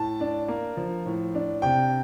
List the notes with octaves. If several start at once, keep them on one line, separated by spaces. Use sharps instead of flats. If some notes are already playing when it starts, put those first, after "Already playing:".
Already playing: A2 A5
D4
A#3
F3
A2
D4
C3 G5